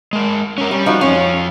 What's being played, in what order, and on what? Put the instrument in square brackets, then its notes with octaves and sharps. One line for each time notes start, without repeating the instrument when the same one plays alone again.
[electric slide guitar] G#3 A#4
C#4 A#4
[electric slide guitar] G3 [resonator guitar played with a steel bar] C#4
[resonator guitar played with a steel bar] F3 D#4 F#4
[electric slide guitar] F2 F4 [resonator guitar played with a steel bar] C#4